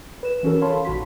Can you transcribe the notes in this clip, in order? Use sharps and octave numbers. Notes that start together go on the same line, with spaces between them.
B4 E7
E3 C#4 F#4 A4 A#4
C#5 F5 A5 B5 C6
A#1 D#3 F#4 C6 B6